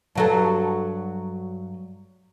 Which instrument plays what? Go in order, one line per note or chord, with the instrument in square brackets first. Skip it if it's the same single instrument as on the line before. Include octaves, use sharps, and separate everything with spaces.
[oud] G2 F#3 A4